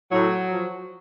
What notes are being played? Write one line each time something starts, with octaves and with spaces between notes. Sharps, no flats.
A2 F#3
F3